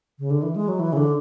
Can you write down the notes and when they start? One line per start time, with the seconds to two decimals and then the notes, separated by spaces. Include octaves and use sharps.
0.19 C#3
0.31 D3
0.42 E3
0.56 G#3
0.68 F#3
0.79 E3
0.93 C#3
0.97 D3